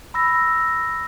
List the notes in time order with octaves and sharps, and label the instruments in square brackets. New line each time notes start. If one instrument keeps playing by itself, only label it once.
[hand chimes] B5 E6 A#6